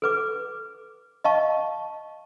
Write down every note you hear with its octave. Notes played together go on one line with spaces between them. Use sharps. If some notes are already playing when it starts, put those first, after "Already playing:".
A4 B4 D6
D#5 F5 A5 C#6